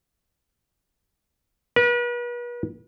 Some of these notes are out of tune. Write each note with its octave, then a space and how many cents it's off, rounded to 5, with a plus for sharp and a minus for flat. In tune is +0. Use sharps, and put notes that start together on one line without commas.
B4 -40